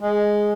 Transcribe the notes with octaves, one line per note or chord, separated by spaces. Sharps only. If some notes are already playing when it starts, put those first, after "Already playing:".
G#3